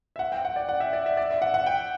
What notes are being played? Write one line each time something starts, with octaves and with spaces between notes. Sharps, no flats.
E5
F#5
G5
F#5
D5
F#5
E5
D5
E5
D5
E5
F#5
F#5
G5